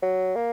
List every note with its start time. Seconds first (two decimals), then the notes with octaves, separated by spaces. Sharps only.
0.03 F#3
0.36 A#3